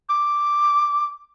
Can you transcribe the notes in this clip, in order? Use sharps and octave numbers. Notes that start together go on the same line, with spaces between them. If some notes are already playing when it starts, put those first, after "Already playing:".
D6